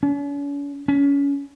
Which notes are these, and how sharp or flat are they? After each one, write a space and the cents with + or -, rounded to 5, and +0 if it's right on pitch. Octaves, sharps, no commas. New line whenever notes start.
C#4 +45
C#4 +25